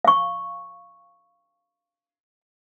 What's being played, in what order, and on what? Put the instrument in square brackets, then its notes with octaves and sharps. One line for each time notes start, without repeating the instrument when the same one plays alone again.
[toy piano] F5 C#6